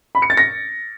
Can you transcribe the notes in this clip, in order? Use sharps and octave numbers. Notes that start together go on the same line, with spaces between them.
B5
C#7
A6
A#6